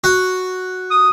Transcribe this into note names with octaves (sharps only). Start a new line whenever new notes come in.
F#4
D#6